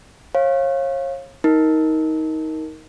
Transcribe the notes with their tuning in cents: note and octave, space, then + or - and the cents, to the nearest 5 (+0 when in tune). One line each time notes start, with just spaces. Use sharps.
C#5 -35 F5 +0
D#4 +20 A#4 +0